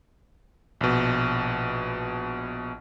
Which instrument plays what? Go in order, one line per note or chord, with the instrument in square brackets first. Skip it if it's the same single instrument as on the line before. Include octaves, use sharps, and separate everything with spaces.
[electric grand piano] A#1 B2